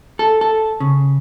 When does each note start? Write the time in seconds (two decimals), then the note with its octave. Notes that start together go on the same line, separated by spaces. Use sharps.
0.19 A4
0.41 A4
0.80 C#3